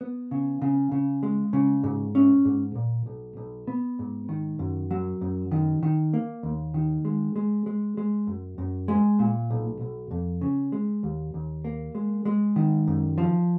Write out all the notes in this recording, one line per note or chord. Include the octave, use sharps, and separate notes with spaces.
B3
C#3
C#3
C#3
G#3
C#3
G#2
C#4
G#2
A#2
B1
B1
B3
G#2
D#3
F#2
F#3
F#2
D#3
D#3
A#3
D#2
D#3
G#3
G#3
G#3
G#3
F#2
F#2
G#3
A#2
B1
B1
F2
C#3
G#3
D#2
D#2
A#3
G#3
G#3
D#3
F#2
F3